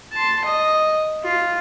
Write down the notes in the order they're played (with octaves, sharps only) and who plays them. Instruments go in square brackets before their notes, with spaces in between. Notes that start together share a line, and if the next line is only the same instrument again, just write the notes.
[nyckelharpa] A5 C6
D#5
F4